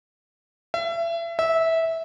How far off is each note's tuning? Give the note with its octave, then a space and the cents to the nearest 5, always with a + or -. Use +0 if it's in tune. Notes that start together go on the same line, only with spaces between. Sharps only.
E5 +30
E5 -15